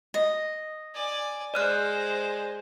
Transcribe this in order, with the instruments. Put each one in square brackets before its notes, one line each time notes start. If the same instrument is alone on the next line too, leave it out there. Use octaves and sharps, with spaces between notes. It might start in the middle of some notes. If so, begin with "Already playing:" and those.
[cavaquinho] D#5
[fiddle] D5 G#5
[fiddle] G#3 C5 [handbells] D5 F6 F#6